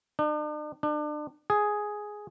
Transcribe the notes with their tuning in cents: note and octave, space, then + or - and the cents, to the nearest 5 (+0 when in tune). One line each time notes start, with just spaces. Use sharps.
D4 +45
D4 +35
G#4 +5